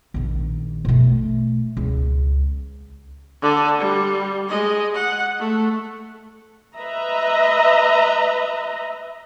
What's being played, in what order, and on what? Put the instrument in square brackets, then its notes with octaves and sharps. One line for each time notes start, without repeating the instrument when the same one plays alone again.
[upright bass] A#1 D#3
B2 A3
C#2
[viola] D3 D5
G3
G#3 D#5
F#5
A3
[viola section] B4 D#5 E5 A#5